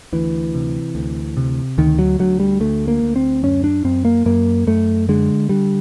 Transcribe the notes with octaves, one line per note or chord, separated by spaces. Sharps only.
D2 E3
C3
D2
C3
D2 D#3
F#3
D2 F#3
G3
D2 A3
A#3
D2
C4
F#2 C#4
D4
F#2 C4
A#3
F#2 A#3
F#2 A3
D3 G#3
D3 G3